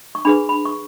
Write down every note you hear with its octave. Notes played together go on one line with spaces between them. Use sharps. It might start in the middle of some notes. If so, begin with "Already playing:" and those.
C#6
D4 G#4 B4 B5
B5
C#6